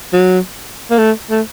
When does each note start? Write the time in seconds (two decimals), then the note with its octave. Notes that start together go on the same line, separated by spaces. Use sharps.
0.13 F#3
0.91 A#3
0.98 A3
1.30 A3